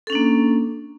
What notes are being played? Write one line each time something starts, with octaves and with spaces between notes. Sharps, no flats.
A#3 C#4 D4 A4